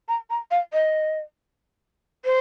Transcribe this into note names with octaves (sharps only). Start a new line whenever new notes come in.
A#5
A#5
F5
D#5
C5